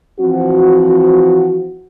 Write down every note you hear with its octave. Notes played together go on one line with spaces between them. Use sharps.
E3 F3 C4 F#4